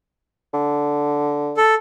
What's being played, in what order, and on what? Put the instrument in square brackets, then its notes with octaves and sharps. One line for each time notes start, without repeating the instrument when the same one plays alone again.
[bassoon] D3
[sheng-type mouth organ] A4